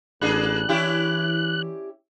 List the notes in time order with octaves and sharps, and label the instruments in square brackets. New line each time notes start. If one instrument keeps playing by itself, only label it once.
[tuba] A1 [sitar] A#3 D4 G#4 [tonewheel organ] F#6
[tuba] E3 [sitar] C#4 E4 G4